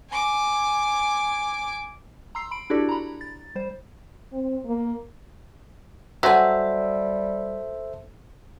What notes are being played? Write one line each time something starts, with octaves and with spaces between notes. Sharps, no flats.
G#5 D6
A#5 C6 E6 C7
B5 D7
D4 E4 F#4 G4 A4 D5
A#5 B5
A6
G3 C5
C4
A#3
F#3 G3 A4 C5 E5 G#5